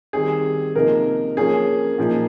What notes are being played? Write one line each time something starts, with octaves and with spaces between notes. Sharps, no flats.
D#3 G3 C4 G#4
C3 F3 A#3 D#4 A#4
C#3 F3 A#3 C#4 G#4
A#2 F3 A#3 D#4